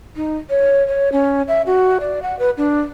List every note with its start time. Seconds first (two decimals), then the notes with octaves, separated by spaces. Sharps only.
0.16 D#4
0.50 C#5
0.88 C#5
1.12 C#4
1.48 E5
1.66 F#4
2.00 D5
2.22 F#5
2.39 B4
2.57 D4